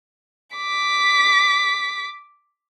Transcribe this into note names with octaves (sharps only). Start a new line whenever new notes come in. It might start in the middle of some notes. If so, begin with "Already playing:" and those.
D6 B6